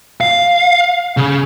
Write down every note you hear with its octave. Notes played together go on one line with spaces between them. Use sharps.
F5
C#3